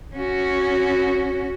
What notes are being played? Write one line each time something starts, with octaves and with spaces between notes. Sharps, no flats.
C#4 F#4